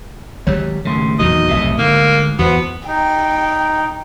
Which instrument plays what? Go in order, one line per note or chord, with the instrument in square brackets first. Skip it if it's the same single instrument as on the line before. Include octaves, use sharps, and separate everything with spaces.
[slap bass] G#1 F#3 G3 [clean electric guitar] C#5
[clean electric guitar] D#2 A2 C6 [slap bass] C#3
[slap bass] E2 A#2 D#3 [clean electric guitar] F#3 D#4 [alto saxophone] D#5
[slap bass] B1 C3 [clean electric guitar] F2 A2 E5
[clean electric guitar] D2 [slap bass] G#2 [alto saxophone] A#3
[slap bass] E2 [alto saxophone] B3 [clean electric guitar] F#4 C5
[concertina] D#4 [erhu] G5